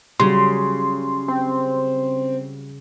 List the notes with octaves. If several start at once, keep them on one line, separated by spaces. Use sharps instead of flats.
C#3 F#3 G3 C6
C4